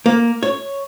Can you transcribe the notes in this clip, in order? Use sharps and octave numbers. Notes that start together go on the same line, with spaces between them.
A#3
C#5